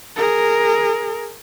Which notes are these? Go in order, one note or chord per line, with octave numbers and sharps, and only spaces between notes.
G#4 A#4